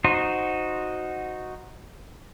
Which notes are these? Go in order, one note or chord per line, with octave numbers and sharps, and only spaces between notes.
D#4 F#4 C5